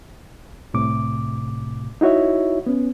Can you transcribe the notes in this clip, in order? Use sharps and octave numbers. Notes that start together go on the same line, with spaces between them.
C2 A2 C3 D6
D#4 E4 F#4 C#5 E5
B3 C#4